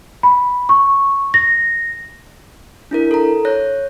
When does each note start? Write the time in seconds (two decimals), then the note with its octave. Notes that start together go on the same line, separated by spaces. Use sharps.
0.23 B5
0.69 C#6
1.34 A#6
2.91 D4 E4 A#4
3.11 A4 A#5
3.45 C#5 F#6 A#6